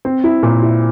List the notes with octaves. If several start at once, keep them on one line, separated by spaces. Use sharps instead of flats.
C4
E4
A#2
E4